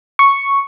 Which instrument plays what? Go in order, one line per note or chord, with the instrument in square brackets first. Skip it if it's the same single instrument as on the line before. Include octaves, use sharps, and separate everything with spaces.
[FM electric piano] C#6